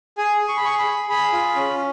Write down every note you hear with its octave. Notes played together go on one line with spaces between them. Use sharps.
G#4 G#5
G#4
C#6
B5
G#4 C#6
B5
G#4
G#4 B5
F4
C#4